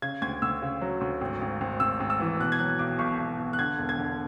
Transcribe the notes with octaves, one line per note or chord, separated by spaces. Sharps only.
C#3 G#6
D2 G#6
D2 E6
C#3
F#3
D2
G#1
G#1
G#1
G#1 E6
G#1
E6
E3
B2 F#6
G#6
F#3 F#6
B1 D6
B1 C#6
B1
B1
F#6
D3 G#6
E1
G#6
D3